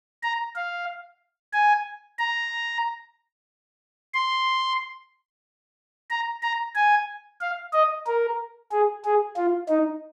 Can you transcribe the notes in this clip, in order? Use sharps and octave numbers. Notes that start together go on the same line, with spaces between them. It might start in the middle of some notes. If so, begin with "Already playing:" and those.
A#5
F5
G#5
A#5
C6
A#5
A#5
G#5
F5
D#5
A#4
G#4
G#4
F4
D#4